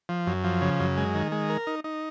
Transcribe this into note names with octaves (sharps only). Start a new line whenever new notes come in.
F3
F#2
F3
C#3
F#2
G#3
D#3
G#3
A#4
D#4
D#4